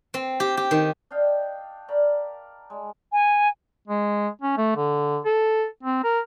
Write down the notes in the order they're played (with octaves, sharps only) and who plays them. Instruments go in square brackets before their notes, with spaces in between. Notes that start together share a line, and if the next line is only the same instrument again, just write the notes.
[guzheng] C4
G4
G4
D#3
[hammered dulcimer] D4 D#5 F5 G5
A#4 D5 F5 B5
G#3
[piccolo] G#5
[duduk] G#3
C#4
A3
D3
A4
C4
A#4